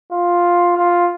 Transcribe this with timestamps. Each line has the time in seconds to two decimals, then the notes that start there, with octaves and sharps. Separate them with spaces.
0.12 F4
0.77 F4